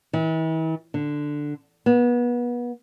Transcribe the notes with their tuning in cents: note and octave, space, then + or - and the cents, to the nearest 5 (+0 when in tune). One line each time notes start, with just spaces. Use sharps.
E3 -40
D3 +5
B3 -30